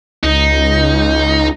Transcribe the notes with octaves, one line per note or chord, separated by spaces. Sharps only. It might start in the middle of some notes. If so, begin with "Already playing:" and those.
C#2 D#4